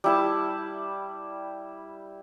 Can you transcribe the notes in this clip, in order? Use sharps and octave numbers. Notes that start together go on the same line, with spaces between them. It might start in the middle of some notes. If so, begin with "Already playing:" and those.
G3 E4 A5